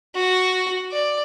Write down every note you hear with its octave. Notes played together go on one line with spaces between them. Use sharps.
F#4
D5